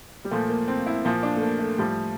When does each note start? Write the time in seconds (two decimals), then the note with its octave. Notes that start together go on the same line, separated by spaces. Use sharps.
0.25 G3
0.31 A#2 F3 A3
0.49 A#3
0.68 C4
0.86 E4
1.05 A#2 F3
1.23 D4
1.36 A3
1.42 A#3
1.59 A3
1.78 A2 F3 G3